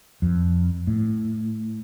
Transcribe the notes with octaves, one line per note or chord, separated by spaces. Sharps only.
F2
A2